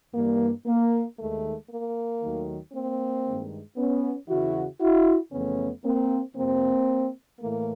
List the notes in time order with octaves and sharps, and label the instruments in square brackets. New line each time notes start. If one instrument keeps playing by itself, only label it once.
[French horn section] G2 E3 G3 A#3
A#3
D#2 D#3 G#3 A3
A#3
D#2 D#3 F#3 A3
A#3 C4
G2 D#3 G#3
B3 C#4
E2 C#3 E3 E4 F#4
E4 F#4
F2 C#3 E3 A3 B3 C#4
A#3 C4
F2 C3 F3 A#3 C4
A2 E3 A3 A#3